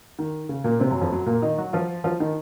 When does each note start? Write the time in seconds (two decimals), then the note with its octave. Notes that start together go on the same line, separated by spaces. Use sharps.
0.19 D#3
0.49 C#3
0.64 A#2 A#3
0.80 C3 C4
0.91 F#2 F#3
1.01 F2 F3
1.11 F#2 F#3
1.26 A#2 A#3
1.42 D#3 D#4
1.58 F#3 F#4
1.73 F3 F4
2.04 F3 F4
2.20 D#3 D#4